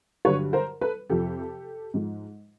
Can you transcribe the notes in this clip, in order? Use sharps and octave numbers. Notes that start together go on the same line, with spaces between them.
G2 D3 F#3 B4 C#5
A#4 C5
A4 B4
F2 C3 F3 G4 A4
G#2 F3 G#3